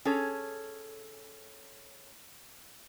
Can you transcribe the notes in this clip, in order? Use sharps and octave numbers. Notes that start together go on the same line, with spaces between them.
C#4 G#4 A4 C#5